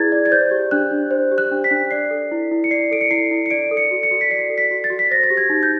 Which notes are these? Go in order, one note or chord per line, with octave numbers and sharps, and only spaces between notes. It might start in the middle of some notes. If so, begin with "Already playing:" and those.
Already playing: E4 G#4 B4 D5 G#6 A6
D5
G#6
C5 G6
G4
D4 F#6
D4
C5
G4
F#6
D4
B6
D4
D5 C7
A4
E4
E4
C#7
D5 C7
A4 D7
C#7
E4 C7
E4
C#7
D5 D7
A4
C#7
F#4
C#7
F#4
B6
D5 C7
A4
B6
F#4
A6
F#4
B6
C5 A#6
A6
G4
G#6
D#4
G6